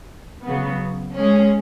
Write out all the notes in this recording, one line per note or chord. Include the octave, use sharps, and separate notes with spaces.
C#3 F#3 B3
G#3 C#4 G#4